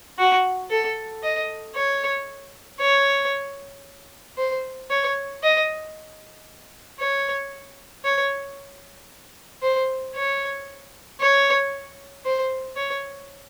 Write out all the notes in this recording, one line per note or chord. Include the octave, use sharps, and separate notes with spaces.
F#4
A4
D#5
C#5
C#5
C5
C#5
D#5
C#5
C#5
C5
C#5
C#5
C5
C#5